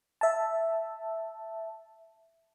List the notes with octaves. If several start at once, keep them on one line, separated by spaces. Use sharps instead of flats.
E5 A5